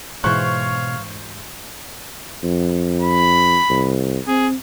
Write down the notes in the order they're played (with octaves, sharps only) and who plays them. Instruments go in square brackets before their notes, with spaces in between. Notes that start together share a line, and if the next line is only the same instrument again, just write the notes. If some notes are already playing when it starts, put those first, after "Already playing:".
[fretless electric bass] G#2 E3 [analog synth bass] B2 [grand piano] C5 C#6 F#6 [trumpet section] C#5 F5
[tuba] F2
[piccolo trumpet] B5
[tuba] C2
[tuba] C4 [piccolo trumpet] G#4